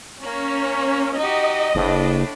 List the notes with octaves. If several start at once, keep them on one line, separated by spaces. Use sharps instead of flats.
A#3 C#4
D#4 F#4 G4 D#5
F#1 A2 A3 D4